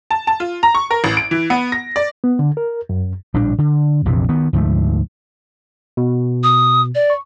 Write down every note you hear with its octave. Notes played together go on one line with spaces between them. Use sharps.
A5
A5
F4
A#5
C#6
A#4
A1
D7
E3
B3
A#6
D5
B3
D3
A#4
F#2
A#1 A2 G3 D4
D3
A#1 F2 C3 E3
D#3 B3
D2 G#2 F3 A3
B2
D#6
D5
C#6